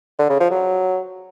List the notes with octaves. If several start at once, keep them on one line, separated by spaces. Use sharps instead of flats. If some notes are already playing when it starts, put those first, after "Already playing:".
D3
C#3
F3
F#3